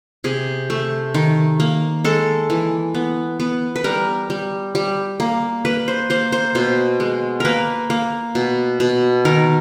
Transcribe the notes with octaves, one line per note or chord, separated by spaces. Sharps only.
C3 G#4
A3
D#3
A#3
G#3 A4
E3
B3
B3
B4
G3 A#4
G3
G3
A#3
A#3 B4
C5
A#3 C5
C5
B2 C5
G#3
A#3 A#4 B4
A#3
B2
B2
D#3 A#4